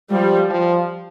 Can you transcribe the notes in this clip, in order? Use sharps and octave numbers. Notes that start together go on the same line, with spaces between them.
F3 G3
F3